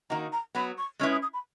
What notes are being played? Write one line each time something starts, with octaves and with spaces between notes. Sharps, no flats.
D#3 A#3 D#4 F#4 A#5
A#5
F#3 B3 F#4 B5
C#6
G#3 C#4 E4 B4 C#6
D#6
D#6
B5